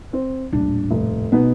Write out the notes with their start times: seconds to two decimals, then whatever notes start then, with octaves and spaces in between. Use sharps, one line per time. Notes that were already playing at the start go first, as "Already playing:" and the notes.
0.13 C4
0.53 D#1 A2 D4
0.90 F1
1.32 B2 B3 D#4